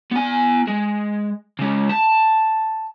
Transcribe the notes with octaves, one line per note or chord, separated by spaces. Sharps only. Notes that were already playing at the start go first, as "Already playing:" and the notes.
B3 G#5
G#3
C#3 G#3
A5